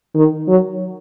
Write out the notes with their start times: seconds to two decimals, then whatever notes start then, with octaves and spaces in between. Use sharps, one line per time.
0.15 D#3
0.48 F#3